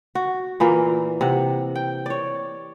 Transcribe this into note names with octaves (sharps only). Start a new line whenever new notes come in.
F#4
A#2 E3 A#3
C3 F#5
G5
C#5 D5